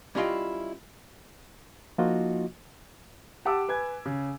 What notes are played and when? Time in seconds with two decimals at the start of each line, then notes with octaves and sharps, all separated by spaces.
0.15 G3 C#4 E4 F4 D#5 G5
1.98 F3 A#3 D#4 F4 F#4 D#5
3.45 G4 F#5 A5 D6 E6
3.68 B4 G#5 G#6
4.05 C#3